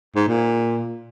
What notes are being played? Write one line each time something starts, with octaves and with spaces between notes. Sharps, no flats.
G#2
A#2